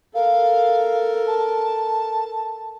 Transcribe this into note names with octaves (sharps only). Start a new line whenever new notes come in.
A4 A#4 F5
A5